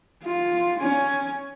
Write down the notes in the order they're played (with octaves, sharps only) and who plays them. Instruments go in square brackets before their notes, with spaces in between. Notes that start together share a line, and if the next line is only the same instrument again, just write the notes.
[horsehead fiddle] F4
C#4